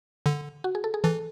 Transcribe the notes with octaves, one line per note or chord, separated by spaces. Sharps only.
D3
F#4
G#4
A4
G#4
E3 A4